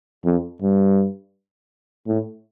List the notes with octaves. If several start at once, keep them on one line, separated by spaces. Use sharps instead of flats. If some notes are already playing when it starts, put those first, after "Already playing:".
F2
G2
A2